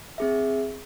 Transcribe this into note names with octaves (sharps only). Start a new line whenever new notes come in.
C4 G#4 E5